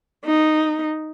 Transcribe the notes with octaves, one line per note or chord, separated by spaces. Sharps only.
D#4